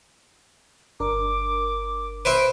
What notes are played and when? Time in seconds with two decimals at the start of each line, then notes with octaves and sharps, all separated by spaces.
1.00 G1 D4 A#4 D6
2.25 B4 C5 E5 D7